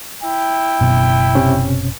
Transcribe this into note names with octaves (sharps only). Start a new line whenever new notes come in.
E4 G5
F#1 B2
C3 C#4